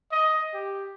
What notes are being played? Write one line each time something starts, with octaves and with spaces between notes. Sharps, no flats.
D#5
G4